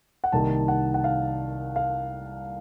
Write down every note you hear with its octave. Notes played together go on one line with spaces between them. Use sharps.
F#5
C2 C3 D#3 A#3 D#4 A5
F#5
F#5
F5
F5